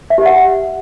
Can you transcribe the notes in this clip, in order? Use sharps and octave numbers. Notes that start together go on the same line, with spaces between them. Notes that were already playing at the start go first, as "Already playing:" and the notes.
E5
G4
F#5